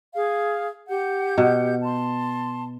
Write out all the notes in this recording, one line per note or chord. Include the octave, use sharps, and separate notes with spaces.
G#4 F5
G4 F#5 G6
B2
A5 C6